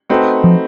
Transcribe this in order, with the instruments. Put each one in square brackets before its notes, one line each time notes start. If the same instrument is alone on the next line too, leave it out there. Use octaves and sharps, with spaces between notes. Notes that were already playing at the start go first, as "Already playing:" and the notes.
[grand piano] A3 C4 D#4 F#4 B4
[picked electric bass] F3